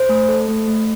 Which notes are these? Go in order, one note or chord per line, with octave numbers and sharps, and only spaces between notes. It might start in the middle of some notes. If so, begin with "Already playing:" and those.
Already playing: C5
A3
A4
A3
A3